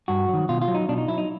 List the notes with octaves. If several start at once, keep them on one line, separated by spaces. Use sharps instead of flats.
G2 F#4
D#3 F#3
B2 F4
F4
F#3
D#4
B2 D4
D#4
F#3 E4
D#4